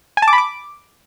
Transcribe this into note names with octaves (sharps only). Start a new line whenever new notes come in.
G#5
A5
D6
B5
D6